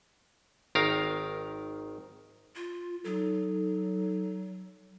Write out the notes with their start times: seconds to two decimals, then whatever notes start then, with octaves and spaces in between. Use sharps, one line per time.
0.75 G#1 D#3 A#4 F5
2.55 F4
3.04 F#3 D#4 A4